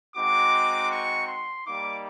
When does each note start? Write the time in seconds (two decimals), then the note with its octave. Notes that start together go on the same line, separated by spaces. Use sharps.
0.15 G#3 C4 D#4 F#4 D6
0.91 C#6
1.28 C6
1.66 G3 A#3 D#4 D6